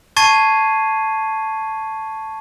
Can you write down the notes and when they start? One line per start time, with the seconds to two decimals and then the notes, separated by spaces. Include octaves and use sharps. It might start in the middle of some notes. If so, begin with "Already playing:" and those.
0.17 A5 C#6 G#6 A6 C7 D#7